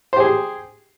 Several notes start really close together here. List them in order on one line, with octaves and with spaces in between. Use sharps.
C5 G4 G#4